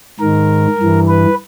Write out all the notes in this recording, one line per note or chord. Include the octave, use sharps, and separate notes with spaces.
G#2 D#3 A#4
G2 E3
B4